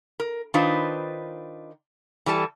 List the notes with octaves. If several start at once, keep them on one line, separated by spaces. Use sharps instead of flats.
A#4
D#3 D4 D#4 F4 B4 C5
E3 G3 A4 A5